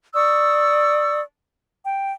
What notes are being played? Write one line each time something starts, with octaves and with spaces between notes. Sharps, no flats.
D5 C#6 D#6 E6
G5